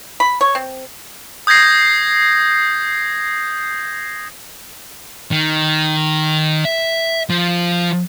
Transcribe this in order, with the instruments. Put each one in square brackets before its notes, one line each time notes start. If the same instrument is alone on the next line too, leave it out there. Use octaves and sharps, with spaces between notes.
[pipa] B5
C#5
C4
[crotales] D#6 G6 G#6 A#6 C7
[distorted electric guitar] D#3
E5
F3